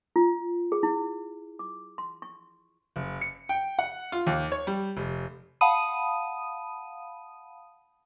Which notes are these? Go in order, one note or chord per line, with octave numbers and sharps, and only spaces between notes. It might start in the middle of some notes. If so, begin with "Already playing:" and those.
F4
G#4
E4
D6
C6
C#6
F#1
C#7
G5
F#5
F4
D#2
C#5
G3
F1
F5 F#5 A5 B5 D#6 D#7